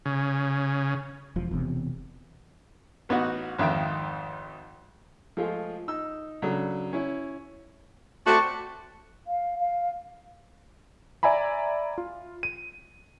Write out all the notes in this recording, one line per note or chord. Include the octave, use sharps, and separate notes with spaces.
C#3
E1 F3
E1 E2 C3
A1 B3 D#4 F#4 F#5
G#1 F2 D#3 E5 F5 G5
F3 G#3 A3 F4 G#4
D#4 E6
C#3 F#3 D4 A4
C#4 E4
A3 C4 F#4 D5 A5 C#6
F5
F5
D5 E5 G#5 A#5 B5
F4
D#7